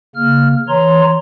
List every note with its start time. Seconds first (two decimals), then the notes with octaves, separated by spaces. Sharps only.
0.15 C#3 A#3 F6
0.68 E3 C#5 A#5 C6